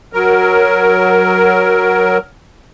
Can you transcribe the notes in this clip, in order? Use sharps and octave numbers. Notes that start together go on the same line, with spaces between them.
F#3 A#4